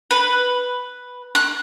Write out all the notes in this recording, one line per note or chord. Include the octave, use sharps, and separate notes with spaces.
B4
F#6